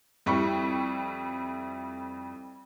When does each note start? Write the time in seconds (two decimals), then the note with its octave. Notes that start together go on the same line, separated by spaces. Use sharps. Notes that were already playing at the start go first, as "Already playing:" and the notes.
0.26 F2 G3 E4 C#6